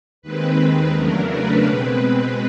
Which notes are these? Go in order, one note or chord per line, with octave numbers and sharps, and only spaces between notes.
D#2 D#3 G#3 C4 B4
E2 C#3 F#3 A3 D4 A#4
B4
B2 G#3 C4
B4